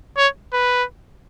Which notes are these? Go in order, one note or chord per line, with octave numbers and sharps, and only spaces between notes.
C#5
B4